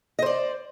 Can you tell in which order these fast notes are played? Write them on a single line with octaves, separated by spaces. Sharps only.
D#5 C5 D5